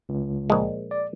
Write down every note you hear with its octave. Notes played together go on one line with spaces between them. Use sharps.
C#2
A#1 G#3
D5